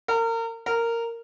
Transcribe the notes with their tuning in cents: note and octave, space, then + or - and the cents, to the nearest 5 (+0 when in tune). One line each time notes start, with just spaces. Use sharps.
A#4 -30
A#4 -10